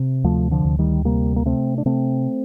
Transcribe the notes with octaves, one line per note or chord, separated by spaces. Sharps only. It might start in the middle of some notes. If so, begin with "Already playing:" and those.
Already playing: C3
D2 F3 A3
D3 F3
D2
D#3 G3
C3 G3 A#3
A#3
C3 A3 C4
D4
C3 A3 C4